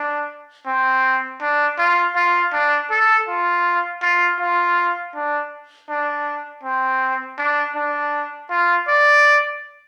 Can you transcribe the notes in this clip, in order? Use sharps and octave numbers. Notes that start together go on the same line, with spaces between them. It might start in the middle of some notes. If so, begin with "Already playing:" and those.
Already playing: D4
C4
D4
F4
F4
D4
A4
F4
F4
F4
D4
D4
C4
D4
D4
F4
D5